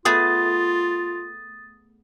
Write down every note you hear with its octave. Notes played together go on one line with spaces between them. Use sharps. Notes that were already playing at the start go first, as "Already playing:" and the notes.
A3 B3 F4 G#4 D#6 A6